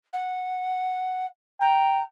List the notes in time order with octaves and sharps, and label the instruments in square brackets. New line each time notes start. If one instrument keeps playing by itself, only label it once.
[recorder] F#5
[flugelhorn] G5 [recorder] A#5